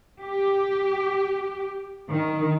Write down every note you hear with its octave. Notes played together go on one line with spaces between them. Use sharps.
G4
D#3